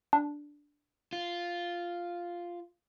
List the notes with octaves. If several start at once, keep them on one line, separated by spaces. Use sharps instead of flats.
D4
F4